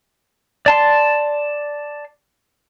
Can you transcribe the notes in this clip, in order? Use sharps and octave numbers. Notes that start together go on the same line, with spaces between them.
D5 A5 C6